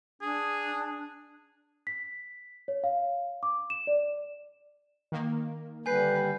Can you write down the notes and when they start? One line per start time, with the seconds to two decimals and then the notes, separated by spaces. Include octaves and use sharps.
0.22 D4 G#4
1.87 B6
2.68 C#5
2.84 F5
3.43 D6
3.70 E7
3.87 D5
5.12 D#3 A#3
5.86 D3 G3 B4 G#5 G6 C7